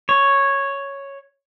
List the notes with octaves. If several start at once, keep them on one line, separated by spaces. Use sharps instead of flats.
C#5